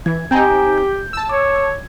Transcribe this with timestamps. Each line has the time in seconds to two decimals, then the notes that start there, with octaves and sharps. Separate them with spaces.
0.06 E3 G#6
0.31 C4 D#4 G4 G#5 A#5 G6
0.78 G6
1.13 A5 E6
1.29 C#5 D6
1.56 G#6